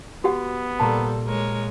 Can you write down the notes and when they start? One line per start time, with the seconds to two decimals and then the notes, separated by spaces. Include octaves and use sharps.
0.24 B3 F#4 G4 F#5
0.79 A#2 G3 A#3 A4 A5 A#5 C6
1.27 G#3 A#4 C#5